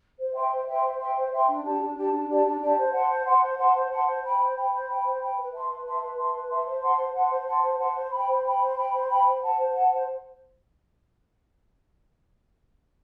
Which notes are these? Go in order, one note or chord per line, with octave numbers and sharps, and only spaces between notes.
C5
E5 G5 C6
C5
E5 G5 C6
C5
E5 G5 C6
C5
E5 G5 C6
D4
G4 D5 A5
D4
G4 D5 A5
D4
G4 D5 A5
D4
G4 D5 A5
C5
F#5 A5 C6
C5
F#5 A5 C6
C5
F#5 A5 C6
C5
F#5 A5 C6
C5
G5 B5
C5
G5 B5
C5
G5 B5
C5
G5 B5
B4
E5 A5 C6
B4
E5 A5 C6
B4
E5 A5 C6
B4
E5 A5 C6
C5
F#5 A5 C6
C5
F#5 A5 C6
C5
F#5 A5 C6
C5
F#5 A5 C6
C5
G5 B5
C5
G5 B5
C5
G5 B5
C5
G5 B5
C5
F#5 A5
C5
F#5 A5
C5